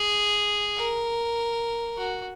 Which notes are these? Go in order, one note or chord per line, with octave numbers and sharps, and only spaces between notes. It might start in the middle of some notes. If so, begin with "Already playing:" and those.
Already playing: G#4
A#4
F#4